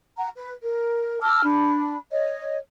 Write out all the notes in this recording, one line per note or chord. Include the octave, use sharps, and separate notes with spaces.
F#5 A#5
B4
A#4
A5 D6 E6 F6
D4 B5
C#5 D#5